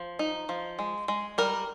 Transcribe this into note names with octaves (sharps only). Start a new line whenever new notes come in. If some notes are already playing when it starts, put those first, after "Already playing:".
Already playing: F3
D#4
F3
G#3
G#3
G3 A#4